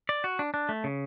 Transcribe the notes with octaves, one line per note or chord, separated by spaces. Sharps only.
D5
F#4
D4
D4
A3
C#3